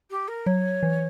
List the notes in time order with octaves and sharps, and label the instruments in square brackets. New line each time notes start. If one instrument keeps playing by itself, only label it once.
[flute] G4
A#4
[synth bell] F#3 [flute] C#5
[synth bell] E3